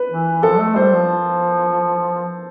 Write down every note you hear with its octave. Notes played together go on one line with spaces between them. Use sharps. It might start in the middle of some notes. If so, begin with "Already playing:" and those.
Already playing: B4
E3
F3 A4
A3
G3 C5
F3